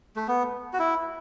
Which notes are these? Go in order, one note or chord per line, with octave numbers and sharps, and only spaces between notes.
A3
B3
F#4
E4